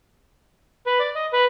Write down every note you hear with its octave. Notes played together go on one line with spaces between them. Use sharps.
B4
D5
D#5
B4